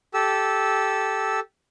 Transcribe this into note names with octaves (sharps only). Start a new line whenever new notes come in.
G4 A4 E6